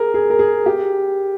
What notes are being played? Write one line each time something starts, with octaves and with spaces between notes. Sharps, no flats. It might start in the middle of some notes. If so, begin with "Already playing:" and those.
Already playing: G#4 A#4
G#4
A#4
G#4
G4